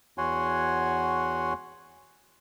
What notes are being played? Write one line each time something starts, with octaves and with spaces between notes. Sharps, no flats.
E2 F#4 C#5 F#5 G#5 C6